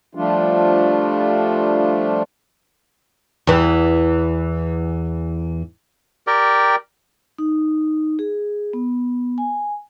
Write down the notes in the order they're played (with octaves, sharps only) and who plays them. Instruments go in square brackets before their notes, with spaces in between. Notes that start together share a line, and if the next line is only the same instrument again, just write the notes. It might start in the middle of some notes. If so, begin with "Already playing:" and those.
[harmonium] F3 G3 A3 D4 F4
[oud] E2 E3
[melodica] G4 A#4 D5 G5
[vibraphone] D#4
G#4
B3
G#5